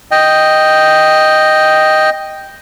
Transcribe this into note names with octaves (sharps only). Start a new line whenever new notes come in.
D#5 G5